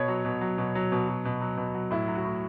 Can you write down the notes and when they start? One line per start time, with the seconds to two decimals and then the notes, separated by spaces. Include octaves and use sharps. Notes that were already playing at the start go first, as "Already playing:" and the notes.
Already playing: B2 C#5
0.08 F#3
0.25 B2
0.41 F#3
0.58 B2
0.75 F#3
0.92 B2
1.08 F#3
1.25 B2
1.41 F#3
1.57 B2
1.74 F#3
1.91 A2 E4
2.08 F#3
2.15 F#4
2.25 A2